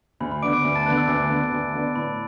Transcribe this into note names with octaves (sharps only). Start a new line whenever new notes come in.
D2 B5
B5
D3 B3 D4 D6 D7
D6 D7
D2
A5 A6
D3 B3 D4 F#6
E6
D2 D6
D3 B3 D4
D2
D3 B3 D4
A2 B5